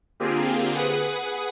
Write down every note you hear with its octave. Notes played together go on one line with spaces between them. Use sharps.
D3 A#3 C4 F4 G4 G#4
G#4 B4 F#5 D#6